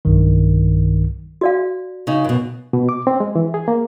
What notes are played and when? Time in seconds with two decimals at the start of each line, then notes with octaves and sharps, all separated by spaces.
0.05 B1 G2 D#3
1.41 F#4 D5 F5
2.07 C#3 D#4
2.24 F#2 B2
2.73 B2
2.89 D6
3.07 C4
3.20 G#3
3.36 E3
3.54 G#4
3.68 A#3